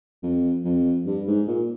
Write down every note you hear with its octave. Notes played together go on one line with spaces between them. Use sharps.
F2
F2
G2
G#2
A#2